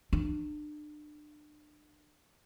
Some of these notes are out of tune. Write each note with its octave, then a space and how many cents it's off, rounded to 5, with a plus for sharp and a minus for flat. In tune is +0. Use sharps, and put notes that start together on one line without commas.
D4 +35